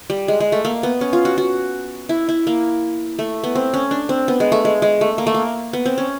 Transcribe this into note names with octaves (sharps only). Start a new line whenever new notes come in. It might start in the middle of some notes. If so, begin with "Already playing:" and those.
G3
G#3
G#3
A3
A#3
B3
C#4
F4
F#4
F#4
E4
E4
A#3
A3
B3
C4
C#4
D4
C4
B3
G#3
A3
G#3
G#3
A3
A#3
A3
A#3
B3
C4
C#4